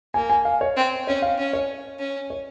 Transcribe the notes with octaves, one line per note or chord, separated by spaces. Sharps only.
A#3 G#5
G#5
F5
C#5
C4
C#4 C#5
F5
C#4
C#5
C#4
C#5